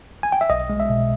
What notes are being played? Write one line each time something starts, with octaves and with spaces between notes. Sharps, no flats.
G#5
G5
E5
B1 D#5
G#3
E5
B2